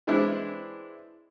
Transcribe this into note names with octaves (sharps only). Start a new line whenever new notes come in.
E3 G#3 C4 D4 E4